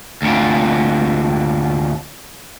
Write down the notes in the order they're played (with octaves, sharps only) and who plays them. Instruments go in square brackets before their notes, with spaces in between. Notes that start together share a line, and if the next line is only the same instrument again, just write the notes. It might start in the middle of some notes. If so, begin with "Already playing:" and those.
[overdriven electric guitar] D2 A#2